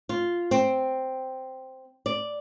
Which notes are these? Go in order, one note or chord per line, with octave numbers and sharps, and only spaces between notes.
F4
C4
D5